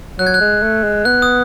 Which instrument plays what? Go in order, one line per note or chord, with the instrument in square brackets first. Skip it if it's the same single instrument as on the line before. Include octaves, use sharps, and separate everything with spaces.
[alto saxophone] F#3 [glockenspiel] F#6
[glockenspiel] G#6
F#6
[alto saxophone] G#3
A3
G#3
[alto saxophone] B3 [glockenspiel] F#6
[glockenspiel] D#6